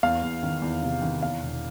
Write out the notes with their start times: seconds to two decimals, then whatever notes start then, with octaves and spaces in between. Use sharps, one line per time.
0.03 E2 F5
0.23 E2
0.43 D#3
0.62 E2
0.83 C3
1.02 D#3
1.22 E2 F5
1.42 E1